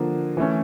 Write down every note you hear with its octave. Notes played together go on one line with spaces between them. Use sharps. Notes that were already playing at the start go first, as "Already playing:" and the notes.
Already playing: D3 F3 A#3
E3 A3 C#4